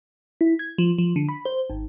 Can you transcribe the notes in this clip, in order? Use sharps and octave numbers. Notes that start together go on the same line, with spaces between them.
E4
G#6
F3
F3
D3
B5
C5
G#1